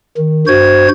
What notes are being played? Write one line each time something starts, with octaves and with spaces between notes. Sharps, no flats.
D#3
G2 F#4 C5 G#6